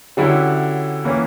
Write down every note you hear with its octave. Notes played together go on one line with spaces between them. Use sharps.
D3 F#3 C#4 E4 G4
E3 A#3 C#4